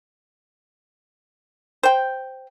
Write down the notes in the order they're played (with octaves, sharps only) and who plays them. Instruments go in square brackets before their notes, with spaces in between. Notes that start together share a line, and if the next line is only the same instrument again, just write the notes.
[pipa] C5 G5